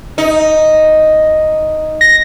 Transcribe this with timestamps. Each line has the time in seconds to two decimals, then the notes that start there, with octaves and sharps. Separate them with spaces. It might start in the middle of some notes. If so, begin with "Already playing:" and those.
0.18 D#4
2.01 A#6